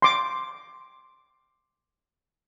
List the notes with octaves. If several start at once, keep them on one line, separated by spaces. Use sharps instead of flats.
C6 D6